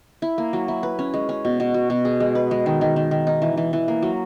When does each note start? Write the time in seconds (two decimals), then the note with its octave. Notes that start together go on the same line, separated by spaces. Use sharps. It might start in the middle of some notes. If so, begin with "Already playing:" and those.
0.22 E4
0.38 A#3
0.53 F#3
0.68 E4
0.83 B4
0.99 C#4
1.14 G#3
1.29 C#4
1.45 B2
1.60 B2
1.74 F#4
1.90 B2
2.05 G#4
2.20 G#3
2.35 B4
2.51 G#3
2.66 D#3
2.81 D#3
2.96 D#3
3.11 D#3
3.27 D#4
3.42 E3
3.57 E3
3.73 E3
3.88 A#3
4.02 F#3